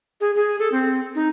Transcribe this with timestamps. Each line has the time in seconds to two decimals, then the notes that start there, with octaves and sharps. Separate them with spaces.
0.21 G#4
0.36 G#4
0.59 A4
0.72 C4
1.15 D#4